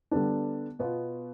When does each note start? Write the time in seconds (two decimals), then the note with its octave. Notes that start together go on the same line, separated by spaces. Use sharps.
0.11 D3 G3 B3 D4
0.79 B2 B3 F4